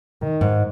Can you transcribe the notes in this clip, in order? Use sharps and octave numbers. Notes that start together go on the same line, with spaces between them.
D#3
G#2